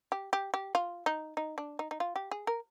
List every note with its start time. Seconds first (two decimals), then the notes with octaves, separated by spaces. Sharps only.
0.12 G4
0.33 G4
0.54 G4
0.75 F4
1.06 D#4
1.37 D#4
1.58 D4
1.79 D#4
1.91 D#4
2.00 F4
2.16 G4
2.31 G#4
2.47 A#4